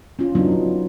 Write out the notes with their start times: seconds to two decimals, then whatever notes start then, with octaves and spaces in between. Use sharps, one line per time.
0.19 C#4 F4
0.35 F#3 B3 D4 D#4 F4